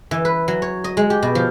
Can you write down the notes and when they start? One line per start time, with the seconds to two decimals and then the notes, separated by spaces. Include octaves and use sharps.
0.11 E3
0.25 B4
0.48 F#3
0.62 C#5
0.84 D#5
0.97 G#3
1.10 G4
1.23 B2
1.35 F3